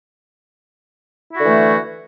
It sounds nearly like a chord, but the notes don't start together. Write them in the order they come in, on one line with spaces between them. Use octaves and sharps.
E4 F#4 D3 E3 A3